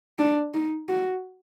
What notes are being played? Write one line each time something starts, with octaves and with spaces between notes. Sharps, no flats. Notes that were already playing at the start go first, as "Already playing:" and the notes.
D4
D#4
F#4